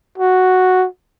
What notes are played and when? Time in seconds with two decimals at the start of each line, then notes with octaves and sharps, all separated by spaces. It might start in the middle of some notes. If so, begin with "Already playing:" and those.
0.18 F#4